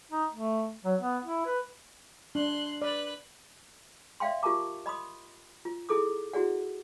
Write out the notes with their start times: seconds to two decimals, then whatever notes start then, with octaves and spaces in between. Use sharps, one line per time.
0.11 D#4
0.33 A3
0.84 F#3
1.00 B3
1.25 E4
1.46 B4
2.35 D4 C6 F#6
2.82 B4 D5 F#6
4.20 D5 E5 F5 G5 C6
4.43 F4 G4 A#4 A5 A#5 D6
4.86 D#5 B5 C6 D#6
5.65 F4
5.89 E4 G#4 A4 D6 D#6
6.33 E4 F#4 G#4 D5 F#5